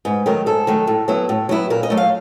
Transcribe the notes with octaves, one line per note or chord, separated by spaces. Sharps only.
G#2 B4
D#3 F#3 A3 A#4
G#2 A4
D#3 F#3 A3
A2
F#3 B3 E4
A2
F#3 B3 E4
A#2 A#4
D#5
F#3 A3
F5